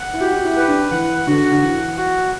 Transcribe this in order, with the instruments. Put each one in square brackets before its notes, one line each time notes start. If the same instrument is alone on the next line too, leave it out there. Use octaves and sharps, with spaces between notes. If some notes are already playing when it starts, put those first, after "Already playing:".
Already playing: [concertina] F#5
[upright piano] E4
[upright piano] F#4 [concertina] G4
[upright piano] F#4
E4
[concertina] B4
[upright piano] D4
[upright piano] E3 [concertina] F#5
[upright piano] D3 [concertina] F#4
[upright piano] D3
[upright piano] E3 [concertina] F#5
[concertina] F#4